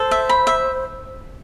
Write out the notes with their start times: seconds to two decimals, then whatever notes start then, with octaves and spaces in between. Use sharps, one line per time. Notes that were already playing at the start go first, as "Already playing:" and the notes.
Already playing: A4 C5
0.11 E5
0.29 B5
0.47 E5